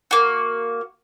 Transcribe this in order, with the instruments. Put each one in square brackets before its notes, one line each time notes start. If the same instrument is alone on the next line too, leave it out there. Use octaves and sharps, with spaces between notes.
[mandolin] A#3 F#4